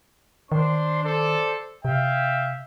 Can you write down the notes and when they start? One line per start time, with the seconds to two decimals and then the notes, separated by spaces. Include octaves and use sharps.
0.52 D#3 D4 C5 C6
1.03 A4 C5 D5
1.85 C3 E5 F5 G5